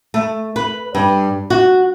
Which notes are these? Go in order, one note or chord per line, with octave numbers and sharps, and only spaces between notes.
A3
B4
G2
F#4